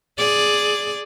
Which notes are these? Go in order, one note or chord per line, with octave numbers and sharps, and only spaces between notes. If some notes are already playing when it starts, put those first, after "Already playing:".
G#4 D5